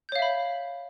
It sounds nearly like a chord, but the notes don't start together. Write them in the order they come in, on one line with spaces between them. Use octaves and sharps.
G6 C#5 F5 E5 B5